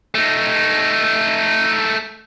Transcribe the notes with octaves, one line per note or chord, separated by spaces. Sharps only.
A3 D#4